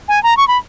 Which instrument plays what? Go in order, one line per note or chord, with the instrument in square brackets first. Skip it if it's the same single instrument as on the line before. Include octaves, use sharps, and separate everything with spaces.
[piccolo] G#5
A#5
C#6
B5